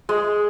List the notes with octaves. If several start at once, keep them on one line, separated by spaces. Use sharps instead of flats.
G#3